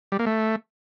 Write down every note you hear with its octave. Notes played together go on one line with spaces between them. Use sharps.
G3
A#3
A3